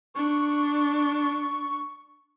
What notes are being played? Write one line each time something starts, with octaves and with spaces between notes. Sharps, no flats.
D4 C#6